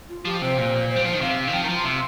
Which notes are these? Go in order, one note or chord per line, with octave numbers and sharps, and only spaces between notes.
F4
F3 G4
C3 C5
A#2
C5
G3
F3 C5
D#3
C3 F5
D#3
F3 G5
D#3 A#5
F3
C6
C3